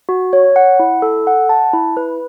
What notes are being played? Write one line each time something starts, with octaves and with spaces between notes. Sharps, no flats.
F#4
C#5
F#5
E4
A4
F#5
A5
E4
B4